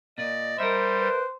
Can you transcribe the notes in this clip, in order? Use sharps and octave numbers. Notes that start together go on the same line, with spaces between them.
A#2 D5 D#5
G3 A#4 C5 E5
B4